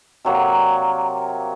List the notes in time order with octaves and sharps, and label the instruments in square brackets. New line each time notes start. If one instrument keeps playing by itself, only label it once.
[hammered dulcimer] C3 F#3 A#3 D5